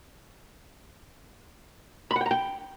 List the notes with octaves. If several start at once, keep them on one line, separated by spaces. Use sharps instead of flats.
B5
F#5
G5
A#5
G5